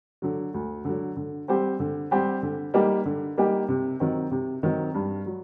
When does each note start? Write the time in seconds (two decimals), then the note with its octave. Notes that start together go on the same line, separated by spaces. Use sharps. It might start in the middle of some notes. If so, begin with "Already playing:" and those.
0.22 D3 F#3
0.54 D2
0.85 D3 F#3
1.16 D3
1.48 G3 C4 G4 C5
1.80 D3
2.11 G3 C4 G4 C5
2.43 D3
2.74 G3 A#3 D#4 G4
3.05 D3
3.37 G3 A#3 D#4 G4
3.69 C3
4.00 D#3 F#3 C4
4.31 C3
4.63 D#3 F#3 C4
4.94 G2
5.26 F#3